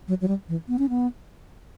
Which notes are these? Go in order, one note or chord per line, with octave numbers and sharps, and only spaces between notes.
F#3
F#3
G3
E3
B3
C#4
B3